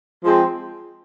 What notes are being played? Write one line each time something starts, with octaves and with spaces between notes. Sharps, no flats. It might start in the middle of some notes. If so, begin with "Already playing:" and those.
F3 G#3 C4